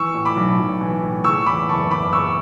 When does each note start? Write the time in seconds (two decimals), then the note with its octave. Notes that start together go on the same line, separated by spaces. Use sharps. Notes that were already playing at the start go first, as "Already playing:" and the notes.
Already playing: E3 C#6 E6
0.14 A2
0.25 B5 D6
0.36 B1
0.59 B1
0.81 E3
1.03 A2
1.24 C#3 C#6 E6
1.46 E2 B5 D6
1.69 F#1 A5 C#6
1.91 F#1 B5 D6
2.13 C#3 C#6 E6